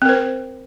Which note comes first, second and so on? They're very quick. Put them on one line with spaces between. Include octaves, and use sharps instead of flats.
C4 A#4 C5